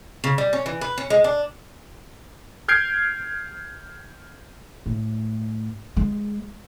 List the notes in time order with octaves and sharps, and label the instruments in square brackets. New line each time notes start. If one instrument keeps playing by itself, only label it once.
[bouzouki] C#3
G3
C#4
E3
B4
C#4
G#3
D4
[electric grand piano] F6 G6 G#6 C7 D7
[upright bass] A2
G#3